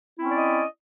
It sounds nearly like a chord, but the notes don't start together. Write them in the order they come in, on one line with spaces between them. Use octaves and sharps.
E4 C4 C#4 D5 D#5